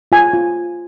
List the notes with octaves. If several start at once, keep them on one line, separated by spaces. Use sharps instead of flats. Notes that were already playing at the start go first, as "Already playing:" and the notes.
F4 G#5
F4